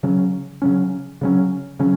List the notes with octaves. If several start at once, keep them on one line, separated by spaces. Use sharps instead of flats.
C#3 F#3 C#4
C#3 F#3 C#4
C#3 F#3 C#4
C#3 F#3 C#4